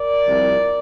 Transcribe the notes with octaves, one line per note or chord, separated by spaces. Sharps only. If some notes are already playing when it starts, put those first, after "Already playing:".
Already playing: A#4 D5
C2 C3 F3